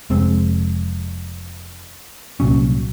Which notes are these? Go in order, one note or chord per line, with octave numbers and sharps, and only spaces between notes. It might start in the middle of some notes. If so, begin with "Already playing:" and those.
F1 G#3 C4
C2 A#2 F#3 C#4